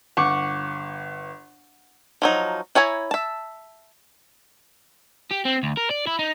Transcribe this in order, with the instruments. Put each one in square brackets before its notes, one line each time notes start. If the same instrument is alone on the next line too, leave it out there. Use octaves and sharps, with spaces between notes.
[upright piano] G1 [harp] F#5 C#6 D6
[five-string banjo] F3 F#3 D#4
E4 C#5 G#5 A#5
E5 A5
[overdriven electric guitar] G4
C4
D2
A#4
D5
E4
D#4